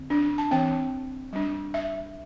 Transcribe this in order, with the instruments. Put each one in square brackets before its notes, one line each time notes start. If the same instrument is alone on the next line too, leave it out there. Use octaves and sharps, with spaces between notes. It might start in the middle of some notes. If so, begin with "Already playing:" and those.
Already playing: [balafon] D3 C4
D4
A5
E3 C4 G5
G3 D4
E5